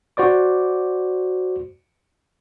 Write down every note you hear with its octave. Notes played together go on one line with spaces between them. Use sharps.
F#4 C5 D5 D6